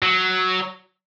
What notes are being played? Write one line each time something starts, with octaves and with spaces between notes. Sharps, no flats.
F#3